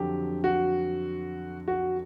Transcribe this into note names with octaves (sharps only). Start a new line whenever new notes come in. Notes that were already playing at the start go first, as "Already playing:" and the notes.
Already playing: F2 D3 F#3 G4
F#4
F#4